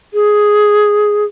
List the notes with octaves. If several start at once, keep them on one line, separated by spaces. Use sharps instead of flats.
G#4